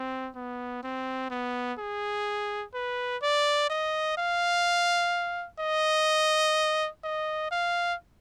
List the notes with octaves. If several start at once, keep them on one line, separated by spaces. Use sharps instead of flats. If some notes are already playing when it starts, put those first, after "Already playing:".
Already playing: C4
B3
C4
B3
G#4
B4
D5
D#5
F5
D#5
D#5
F5